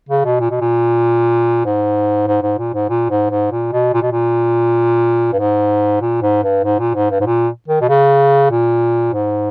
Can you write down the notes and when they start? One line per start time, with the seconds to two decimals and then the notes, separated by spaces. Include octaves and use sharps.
0.09 C#3
0.25 B2
0.40 A#2
0.51 B2
0.61 A#2
1.65 G#2
2.27 G#2
2.43 G#2
2.58 A#2
2.74 G#2
2.90 A#2
3.10 G#2
3.31 G#2
3.52 A#2
3.73 B2
3.94 A#2
4.02 B2
4.12 A#2
5.33 G2
5.39 G#2
6.02 A#2
6.22 G#2
6.44 G2
6.64 G#2
6.79 A#2
6.95 G#2
7.11 G2
7.21 G#2
7.26 A#2
7.68 D#3
7.82 B2
7.89 C#3
8.51 A#2
9.13 G#2